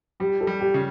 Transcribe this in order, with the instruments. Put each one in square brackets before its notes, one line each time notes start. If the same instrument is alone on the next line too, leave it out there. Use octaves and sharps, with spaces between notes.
[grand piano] G3 [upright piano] G4
[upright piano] A4
[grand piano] G3
[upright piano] G4
[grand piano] C#3